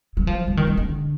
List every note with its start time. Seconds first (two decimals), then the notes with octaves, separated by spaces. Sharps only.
0.17 F#3
0.27 F3
0.47 F3
0.57 D#3
0.67 D3
0.77 D3